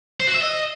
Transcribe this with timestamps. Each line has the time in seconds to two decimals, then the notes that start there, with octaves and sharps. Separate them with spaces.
0.20 C5
0.27 F#4
0.34 E5
0.41 D#5